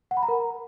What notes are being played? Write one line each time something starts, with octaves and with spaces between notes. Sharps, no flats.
F#5
B5
A#5
A#4